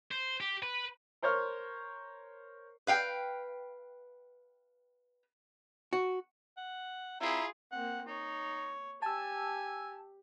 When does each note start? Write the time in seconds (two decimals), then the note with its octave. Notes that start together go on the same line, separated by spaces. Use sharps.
0.11 C5
0.40 G4
0.63 B4
1.22 A#4 C5 C#5 C#6 F6
2.87 B4 F5 G5
5.93 F#4
6.57 F#5
7.21 C4 E4 F4 G#4 A#5
7.72 A#3 C4 F#5
8.08 D#4 C#5
9.02 G4 G#5 A5 E6